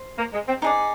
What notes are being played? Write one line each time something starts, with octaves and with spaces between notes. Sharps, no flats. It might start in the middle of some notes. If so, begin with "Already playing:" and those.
Already playing: C5
A#3
G#3
C4
D4 D#4 G#4 D5